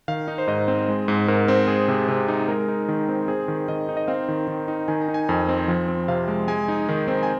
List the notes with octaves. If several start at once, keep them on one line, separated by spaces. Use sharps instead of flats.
D#3 F5
D#4
C5
G#2 D#5
C4
G#3
G#2
G#2 A#4
C4
G#3 G#4
C3
C3
D#4
G#3 A#4
D#4
D#3
C4
C4 G#4
D#3
D#3 D#5
D#4
D#5
C4 F5
D#3
D#3
D#4
D#3 G#5
A#5
D#4
G#5
F2
C4
F3
C4
C3 F5
G#3
G#3 G#5
D#4
D#3
C4
G#5